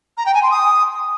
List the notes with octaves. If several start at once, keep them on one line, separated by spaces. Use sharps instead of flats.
A#5
G5
G#5
C6
D#6